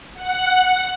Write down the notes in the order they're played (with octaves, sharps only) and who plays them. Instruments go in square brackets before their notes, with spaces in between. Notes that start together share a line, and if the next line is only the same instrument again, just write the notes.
[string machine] F#5